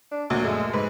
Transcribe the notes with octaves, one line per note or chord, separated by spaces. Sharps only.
D4
D2 A#2 F#3
F#2 G#3 A3
G#2 B4